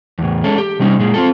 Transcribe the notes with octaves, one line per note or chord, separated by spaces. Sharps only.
E2 A2
G#3 C#4 A4
G4
C3 G3 C#4 D#4
A#2 G#3
C4 F4 A4